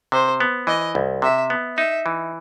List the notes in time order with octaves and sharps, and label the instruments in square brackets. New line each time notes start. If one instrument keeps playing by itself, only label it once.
[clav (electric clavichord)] C3 [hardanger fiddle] C5
[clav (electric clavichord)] B3
[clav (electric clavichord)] E3 [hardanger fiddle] D#5
[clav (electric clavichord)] C2
[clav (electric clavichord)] C3 [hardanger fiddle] E5
[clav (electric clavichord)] B3
[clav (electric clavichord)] D#4 [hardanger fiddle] E5
[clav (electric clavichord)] E3